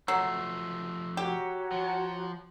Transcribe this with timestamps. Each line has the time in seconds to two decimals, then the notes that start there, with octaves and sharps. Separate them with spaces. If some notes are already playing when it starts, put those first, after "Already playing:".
0.08 F3 F#3 A3 E6 C7
1.17 F#4 G4 C#5 A#5
1.72 F3